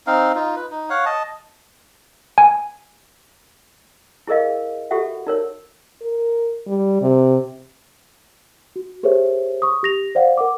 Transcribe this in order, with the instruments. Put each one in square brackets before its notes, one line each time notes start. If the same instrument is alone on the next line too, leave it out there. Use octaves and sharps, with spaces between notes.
[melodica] C4 D#4 F5
D#4 F4
B4
D#4
C#5 F5 F#5
D#5 A5
[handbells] G#5
[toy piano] E4 G#4 A#4 D#5 F5
F#4 G4 A4 E5 F#5
D#4 A#4 C#5
[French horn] A#4
G3
C3
[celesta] F#4
G4 G#4 A#4 C5 C#5 E5
C#6 D#6
G4 A#6 F7
C5 D5 F5 F#5
A#4 F#5 D6